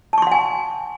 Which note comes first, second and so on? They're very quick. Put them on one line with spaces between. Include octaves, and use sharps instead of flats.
A5 C#6 C6 F#5 G#5